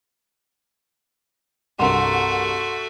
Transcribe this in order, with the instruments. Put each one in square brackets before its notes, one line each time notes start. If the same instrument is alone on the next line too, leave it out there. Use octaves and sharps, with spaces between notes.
[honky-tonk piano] C2 G2 A#4 [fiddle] A3 F#4 [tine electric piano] F#5 C6